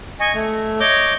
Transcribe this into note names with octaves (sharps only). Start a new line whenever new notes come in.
D#5 G#5 C#6
A3
C#5 D#5 D6 G6